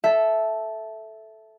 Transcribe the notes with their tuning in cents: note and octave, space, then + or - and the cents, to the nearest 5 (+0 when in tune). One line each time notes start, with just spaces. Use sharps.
A4 -10 E5 +0